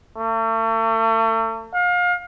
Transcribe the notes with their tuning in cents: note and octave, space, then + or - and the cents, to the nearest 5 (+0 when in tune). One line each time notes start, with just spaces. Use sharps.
A3 +40
F5 +30